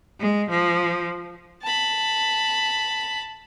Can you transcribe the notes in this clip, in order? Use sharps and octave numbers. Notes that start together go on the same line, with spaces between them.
G#3
F3
A5 B5